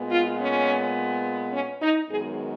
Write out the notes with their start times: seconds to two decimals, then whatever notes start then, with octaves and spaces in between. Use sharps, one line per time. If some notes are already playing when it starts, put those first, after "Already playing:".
Already playing: A#2 G#3 B3
0.11 F4
0.39 C#4
1.53 C#4
1.81 D#4
2.09 F#2 D#3 G#3 B3 G#4